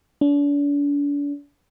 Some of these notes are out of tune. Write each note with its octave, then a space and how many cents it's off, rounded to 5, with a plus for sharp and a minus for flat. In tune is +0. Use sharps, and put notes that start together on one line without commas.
D4 -40